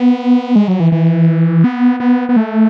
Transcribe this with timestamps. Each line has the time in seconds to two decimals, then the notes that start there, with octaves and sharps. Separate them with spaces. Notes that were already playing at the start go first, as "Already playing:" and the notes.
Already playing: B3
0.56 G#3
0.68 F#3
0.80 E3
0.92 E3
1.64 B3
2.00 B3
2.29 B3
2.36 A3